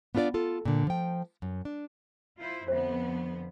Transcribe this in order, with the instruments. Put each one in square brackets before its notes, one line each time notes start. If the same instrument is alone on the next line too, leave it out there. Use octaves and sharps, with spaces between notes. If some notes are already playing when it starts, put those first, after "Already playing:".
[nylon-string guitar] B3 D4 F4 B4 D5
F4 A4
A#2 D3
F3 G5
F#2
D4
[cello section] E4 F4 C5
[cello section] F2 D3 B3 [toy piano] C5 E5